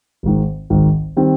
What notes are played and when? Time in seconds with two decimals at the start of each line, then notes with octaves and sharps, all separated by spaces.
0.23 G#1 G#2 D#3
0.70 G#1 G#2 D#3
1.16 D#3 G3 C4